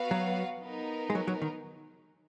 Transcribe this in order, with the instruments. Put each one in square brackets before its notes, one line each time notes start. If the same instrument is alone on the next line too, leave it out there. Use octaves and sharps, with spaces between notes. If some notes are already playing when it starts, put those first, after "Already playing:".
Already playing: [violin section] B3 F#4 B4 F5
[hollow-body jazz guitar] F#3
[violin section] B3 D#4 A#4
[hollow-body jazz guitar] G#3
F#3
F#3
D#3